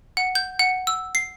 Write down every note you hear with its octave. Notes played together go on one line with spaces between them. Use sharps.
F#5
G6
F#5
E6
C7